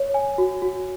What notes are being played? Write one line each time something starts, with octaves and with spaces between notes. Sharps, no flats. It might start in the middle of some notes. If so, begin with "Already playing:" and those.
Already playing: C#5
G#5
F#4
F#4